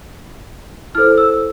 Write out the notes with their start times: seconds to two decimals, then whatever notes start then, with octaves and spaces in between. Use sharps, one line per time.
0.95 E4 A4 C5 F6
1.18 E6